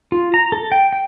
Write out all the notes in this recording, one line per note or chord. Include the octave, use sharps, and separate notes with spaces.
F4
A#5
A4
G5
G5